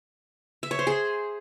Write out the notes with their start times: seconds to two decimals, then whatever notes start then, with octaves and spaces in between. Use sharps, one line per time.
0.63 E5
0.71 C#5
0.79 C5
0.87 G#4